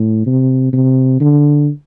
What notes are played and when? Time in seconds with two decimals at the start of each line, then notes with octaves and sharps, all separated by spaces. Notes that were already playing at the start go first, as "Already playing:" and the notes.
Already playing: A2
0.27 C3
0.73 C3
1.21 D3